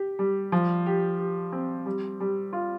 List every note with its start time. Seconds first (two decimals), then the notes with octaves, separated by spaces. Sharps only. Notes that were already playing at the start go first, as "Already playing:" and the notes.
Already playing: G4
0.19 G3
0.52 F3
0.86 G4
1.19 G4
1.52 C4
1.86 G3
2.20 G3
2.53 F4